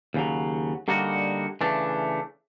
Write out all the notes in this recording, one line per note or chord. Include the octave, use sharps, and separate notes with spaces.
D#2 C#3 F#3
D3 G3 A#3 D#4 F#4
C#3 E3 A3 D4